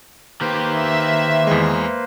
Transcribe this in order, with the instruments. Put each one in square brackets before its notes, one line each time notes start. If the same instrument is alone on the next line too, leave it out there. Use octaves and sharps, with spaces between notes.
[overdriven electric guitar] D#3 G4 [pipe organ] A#3 B4 C5
[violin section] E5
[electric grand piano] E2 G#3